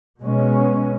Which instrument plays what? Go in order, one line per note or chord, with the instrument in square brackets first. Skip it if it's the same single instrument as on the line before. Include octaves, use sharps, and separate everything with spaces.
[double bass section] B2 G#3 C#4